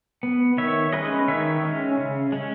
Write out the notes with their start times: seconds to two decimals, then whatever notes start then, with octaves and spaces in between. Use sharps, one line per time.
0.23 B3
0.58 D#3 C#5 E5
0.93 G#3 C#4 B4 D#5
1.28 D#3 C#5 E5
1.63 G#3 C#4
1.98 C#3
2.32 G#3 C#4